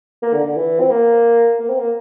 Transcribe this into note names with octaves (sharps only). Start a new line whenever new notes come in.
A#3
D3
D3
E3
C4
A#3
A#3
C4
A#3